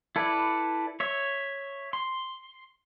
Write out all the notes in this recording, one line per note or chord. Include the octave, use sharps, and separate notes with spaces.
E4 A4 B4 D5
C#5 E5
C6